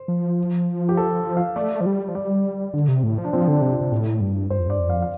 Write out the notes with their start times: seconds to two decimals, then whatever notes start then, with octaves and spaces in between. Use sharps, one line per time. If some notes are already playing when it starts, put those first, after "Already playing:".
Already playing: C5
0.08 F3
0.89 G4
0.97 A4
1.37 F5
1.56 A3 D5
1.81 F3
1.86 G3
2.08 F3
2.15 G3 D5
2.74 D3
2.88 C3
3.03 A2
3.18 F3
3.24 D4
3.33 F3 C4
3.48 D3 D4
3.62 C3
3.72 F4
3.81 C3
3.92 A2
4.21 G2
4.50 G2 C5
4.59 F2
4.67 G2 D5
4.80 F2
4.90 F5
5.02 F5